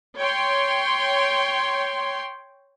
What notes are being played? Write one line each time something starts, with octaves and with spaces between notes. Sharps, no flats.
C#5 G5 C6